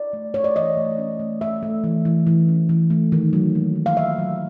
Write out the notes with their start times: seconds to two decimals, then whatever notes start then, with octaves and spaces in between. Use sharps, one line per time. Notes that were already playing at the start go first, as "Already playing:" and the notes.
Already playing: D5
0.13 A3
0.34 A3 C#5
0.44 D5
0.56 E3 D#5
0.77 A3
0.98 C#4
1.19 A3
1.41 A3 E5
1.63 A3
1.84 E3
2.05 E3
2.27 E3
2.48 C#4
2.69 E3
2.90 A3
3.12 D#3
3.33 F#3
3.55 A#3
3.76 F#3
3.86 F5
3.97 D#3 E5
4.18 F#3